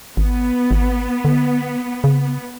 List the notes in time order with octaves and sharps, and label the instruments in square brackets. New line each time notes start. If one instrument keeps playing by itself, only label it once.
[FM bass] G#1 [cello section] B3
[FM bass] G#1
D3
C#3